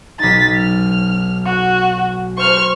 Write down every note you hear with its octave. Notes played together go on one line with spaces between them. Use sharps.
B1 D#4 A6 B6
F6
F#4 C#6 F#6
C5 C#6 F6